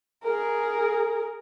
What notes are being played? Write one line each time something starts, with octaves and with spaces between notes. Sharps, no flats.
G#4 A#4